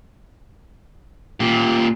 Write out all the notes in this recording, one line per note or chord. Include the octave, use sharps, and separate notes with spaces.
A#2 G4